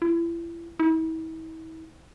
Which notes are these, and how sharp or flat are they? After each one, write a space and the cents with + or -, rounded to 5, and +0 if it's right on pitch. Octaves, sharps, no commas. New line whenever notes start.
E4 +35
E4 -40